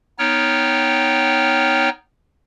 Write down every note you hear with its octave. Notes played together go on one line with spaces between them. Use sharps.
B3 D#4 C#5 G5 F6